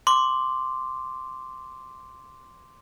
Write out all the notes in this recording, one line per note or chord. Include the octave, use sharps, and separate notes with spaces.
C6 D6